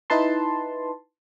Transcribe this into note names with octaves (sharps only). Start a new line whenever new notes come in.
D#4 E4 B4 A5 C6